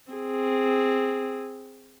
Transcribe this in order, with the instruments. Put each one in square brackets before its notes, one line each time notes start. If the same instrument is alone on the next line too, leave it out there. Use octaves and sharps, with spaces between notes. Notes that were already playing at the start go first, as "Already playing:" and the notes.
[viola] C4 G#4